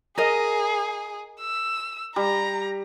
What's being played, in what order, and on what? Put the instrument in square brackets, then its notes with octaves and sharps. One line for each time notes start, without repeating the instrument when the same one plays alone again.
[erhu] G#4 [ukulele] A#4 D#5
[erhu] E6
[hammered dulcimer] G3 [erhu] A#5